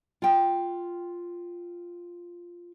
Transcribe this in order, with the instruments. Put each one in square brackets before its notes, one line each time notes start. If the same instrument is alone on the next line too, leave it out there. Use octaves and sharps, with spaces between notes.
[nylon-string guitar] F4 G5